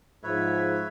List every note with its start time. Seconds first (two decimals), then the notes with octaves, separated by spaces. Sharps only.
0.24 G#2 F3 B4 C#5 E5